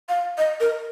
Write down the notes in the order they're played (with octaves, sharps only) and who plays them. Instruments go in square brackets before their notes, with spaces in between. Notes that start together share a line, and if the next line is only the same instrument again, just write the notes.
[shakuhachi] F5
D#5
A#4